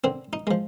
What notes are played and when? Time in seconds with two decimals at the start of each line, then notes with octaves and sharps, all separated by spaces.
0.04 D3 C4
0.33 D#4
0.47 F3 G#3